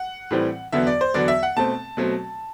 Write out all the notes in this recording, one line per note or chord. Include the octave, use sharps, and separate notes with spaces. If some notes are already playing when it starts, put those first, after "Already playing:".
Already playing: F#5
A2 E3 G3 C4
E2 D3 F#3 B3 E5
D5
C5
E2 D3 F#3 B3 D5
E5
F#5
B2 A3 C4 A5
B2 F#3 A3 C4